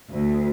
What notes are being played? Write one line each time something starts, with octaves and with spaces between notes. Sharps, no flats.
D2